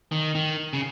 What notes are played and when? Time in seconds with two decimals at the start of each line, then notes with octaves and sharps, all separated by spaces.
0.12 D#3
0.35 D#3
0.73 C#3